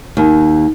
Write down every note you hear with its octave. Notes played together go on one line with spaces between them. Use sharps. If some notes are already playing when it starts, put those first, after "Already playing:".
D#2